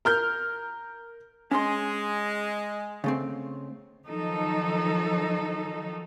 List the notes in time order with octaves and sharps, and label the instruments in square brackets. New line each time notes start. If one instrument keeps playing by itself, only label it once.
[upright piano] A#4 F6 G6
[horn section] G#3 [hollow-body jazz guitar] C#4 C6
[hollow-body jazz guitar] C#3 A3 C4
[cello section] D#3 F3 F#3 D#4 A4